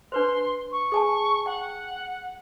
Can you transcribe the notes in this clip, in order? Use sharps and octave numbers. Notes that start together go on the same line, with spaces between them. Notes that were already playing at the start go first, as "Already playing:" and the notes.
D4 B4 C5 C6
C#6
G#4 G#5 A5
F#5 G5